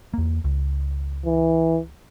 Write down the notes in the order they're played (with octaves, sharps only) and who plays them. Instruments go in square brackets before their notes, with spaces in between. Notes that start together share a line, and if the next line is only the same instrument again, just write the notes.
[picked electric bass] E2 A#3
C#2
[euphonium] E3